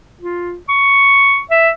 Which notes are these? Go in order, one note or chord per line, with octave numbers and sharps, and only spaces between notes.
F4
C#6
E5